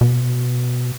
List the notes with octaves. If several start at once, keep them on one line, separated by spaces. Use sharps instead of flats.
B2